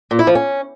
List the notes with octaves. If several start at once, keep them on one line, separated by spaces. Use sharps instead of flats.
A#2
E4
F3
C#4